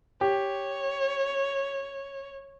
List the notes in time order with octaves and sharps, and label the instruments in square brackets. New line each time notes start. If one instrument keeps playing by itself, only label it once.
[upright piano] G4 [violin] C#5